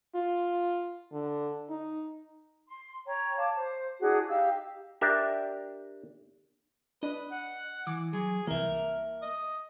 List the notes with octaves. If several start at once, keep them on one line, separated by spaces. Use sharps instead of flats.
F4
D3
D#4
C6
C#5 G5 A#5
C#5 F5 A5 D6
C5
D4 E4 F#4 G#4
D#4 G4 F5 E6
D4 G4 A#4 E5
D4 B4 D#5
F#5
E3 D6
F#3 G#4
C2 E3 A#3 A#4 E5
D#5